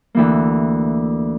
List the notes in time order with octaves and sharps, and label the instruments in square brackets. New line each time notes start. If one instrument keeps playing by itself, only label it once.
[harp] D2 E3 A#3